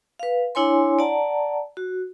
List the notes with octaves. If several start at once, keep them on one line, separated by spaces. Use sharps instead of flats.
B4 F5
D4 E4 C#5 G#5 C6
D5 F#5 A5 A#5
F#4